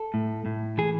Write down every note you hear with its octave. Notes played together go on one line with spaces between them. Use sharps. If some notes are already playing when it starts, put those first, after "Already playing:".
Already playing: A4
A2
A2
E3 G#4